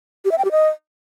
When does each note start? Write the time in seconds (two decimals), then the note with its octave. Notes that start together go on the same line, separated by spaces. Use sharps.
0.25 G4
0.32 E5
0.38 G5
0.45 G4
0.51 D#5